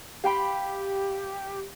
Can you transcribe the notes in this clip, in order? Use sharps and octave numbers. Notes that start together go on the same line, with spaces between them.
G4 F5 G5 B5